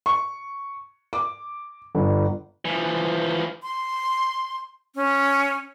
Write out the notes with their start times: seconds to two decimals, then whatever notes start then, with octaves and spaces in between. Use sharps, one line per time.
0.06 C#6
1.13 D6
1.95 G1
2.65 E3 F3
3.63 C6
4.95 C#4